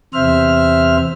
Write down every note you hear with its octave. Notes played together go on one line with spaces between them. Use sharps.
E2 C3 C5 E5 F6